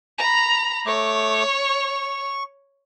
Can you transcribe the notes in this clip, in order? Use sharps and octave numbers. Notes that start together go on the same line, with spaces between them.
A#5 B5
A3 C#5 D6
C#6